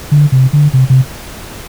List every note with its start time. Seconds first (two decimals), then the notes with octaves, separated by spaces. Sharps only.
0.11 D3
0.32 C3
0.53 D3
0.73 C3
0.90 C3